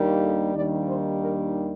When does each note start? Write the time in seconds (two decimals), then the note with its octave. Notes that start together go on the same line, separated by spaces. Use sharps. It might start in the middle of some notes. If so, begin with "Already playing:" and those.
Already playing: D#2 D#3 G3 A#3 D4
0.22 A4
0.54 D#2 D#3 G3 A#3 D4 D5
0.87 C5
1.20 A#4